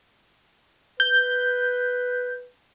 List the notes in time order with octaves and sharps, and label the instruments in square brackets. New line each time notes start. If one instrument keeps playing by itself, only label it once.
[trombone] B4 [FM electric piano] G6